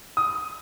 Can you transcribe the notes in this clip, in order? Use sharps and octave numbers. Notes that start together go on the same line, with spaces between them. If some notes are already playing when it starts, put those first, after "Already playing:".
D#6